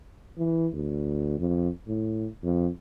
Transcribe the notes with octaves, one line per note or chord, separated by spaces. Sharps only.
E3
D2
F2
A2
F2